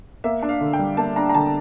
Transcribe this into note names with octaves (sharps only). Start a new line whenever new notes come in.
A#3 E5
D4
F5
D3
G5
G3
A#3 A5
D4 A#5
A#5
D3 A5